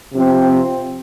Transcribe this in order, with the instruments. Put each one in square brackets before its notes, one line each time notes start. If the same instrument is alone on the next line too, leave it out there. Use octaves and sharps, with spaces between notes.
[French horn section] C3 F3 C4